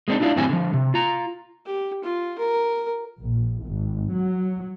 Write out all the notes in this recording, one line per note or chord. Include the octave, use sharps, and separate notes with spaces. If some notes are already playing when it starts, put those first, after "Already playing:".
G#3 A#3 C4 D4 D#4
D4 E4 F4 G4 A#4 D5
F#2 A2 D#3 C4 G4 G#5
D3 F3
C3
F4 A#5
G4
F4
A#4
A#1
G#1
F#3